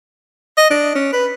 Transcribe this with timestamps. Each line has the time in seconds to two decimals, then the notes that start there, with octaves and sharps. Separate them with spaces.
0.57 D#5
0.70 D4
0.95 C#4
1.13 B4